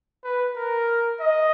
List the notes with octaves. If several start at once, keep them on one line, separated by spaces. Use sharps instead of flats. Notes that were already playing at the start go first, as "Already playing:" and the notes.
B4
A#4
D#5